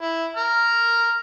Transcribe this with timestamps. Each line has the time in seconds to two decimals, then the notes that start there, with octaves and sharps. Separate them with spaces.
0.02 E4
0.37 A#5 F6